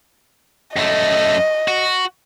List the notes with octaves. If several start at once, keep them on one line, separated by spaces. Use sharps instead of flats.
F#2 A3 D#5
F#4